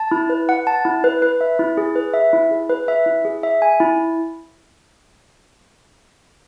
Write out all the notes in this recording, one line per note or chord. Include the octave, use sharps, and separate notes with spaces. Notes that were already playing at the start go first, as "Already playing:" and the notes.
Already playing: A5
E4
B4
F#5
A5
E4
B4
B4
E5
E4
G#4
B4
E5
E4
G#4
B4
E5
E4
G#4
E5
G#5
E4